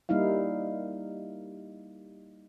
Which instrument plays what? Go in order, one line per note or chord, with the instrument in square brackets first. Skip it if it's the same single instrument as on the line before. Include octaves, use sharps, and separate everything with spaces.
[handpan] G3 A#3 D#4 E4 F5